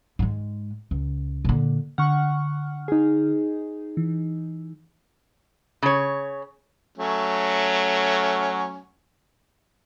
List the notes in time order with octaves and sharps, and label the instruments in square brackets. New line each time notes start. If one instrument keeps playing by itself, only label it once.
[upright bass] G#2 G#3
C#2
A#2 D3
[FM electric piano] D3 F6 [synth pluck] F#5 C#6
[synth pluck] D#4 G#4
[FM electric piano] E3
[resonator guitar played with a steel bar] C#3 C#5
[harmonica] F#3 A3 C#4